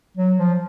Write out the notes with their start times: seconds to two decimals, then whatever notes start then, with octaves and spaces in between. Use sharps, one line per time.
0.17 F#3
0.38 F3